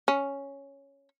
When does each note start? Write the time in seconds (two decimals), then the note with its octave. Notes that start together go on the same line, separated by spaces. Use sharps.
0.08 C#4